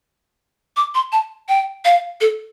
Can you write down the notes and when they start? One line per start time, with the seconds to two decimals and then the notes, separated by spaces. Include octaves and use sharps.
0.77 D6
0.95 C6
1.12 A5
1.49 G5
1.85 F5
2.21 A4